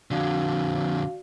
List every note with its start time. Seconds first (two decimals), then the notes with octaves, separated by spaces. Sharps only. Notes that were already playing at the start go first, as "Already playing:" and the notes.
0.11 F2 D3 F#4 D5 F5